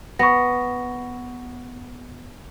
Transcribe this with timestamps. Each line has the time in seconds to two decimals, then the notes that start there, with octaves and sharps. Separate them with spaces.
0.19 B3 C#6 A#6